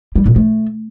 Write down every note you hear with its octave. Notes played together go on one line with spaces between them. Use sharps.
G3
A#2
A3